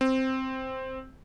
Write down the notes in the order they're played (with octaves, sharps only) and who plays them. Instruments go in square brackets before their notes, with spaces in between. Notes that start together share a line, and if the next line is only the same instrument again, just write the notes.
[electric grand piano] C4